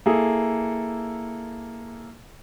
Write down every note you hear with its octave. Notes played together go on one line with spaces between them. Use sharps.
A#3 E4 G#4 A4